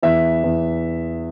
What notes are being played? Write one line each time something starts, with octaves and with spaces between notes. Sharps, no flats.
E2 E5
E2